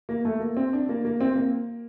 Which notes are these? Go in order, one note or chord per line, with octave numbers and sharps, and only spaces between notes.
A#3
A3
A#3
C4
D4
A#3
A#3
C4
A#3